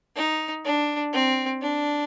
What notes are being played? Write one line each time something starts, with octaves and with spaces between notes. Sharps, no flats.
D#4
D4
C4
D4